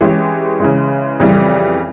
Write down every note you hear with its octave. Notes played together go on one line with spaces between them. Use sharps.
E3 G#3 C#4 G4
C#3 E3 G#3
F2 C#3 E3 G3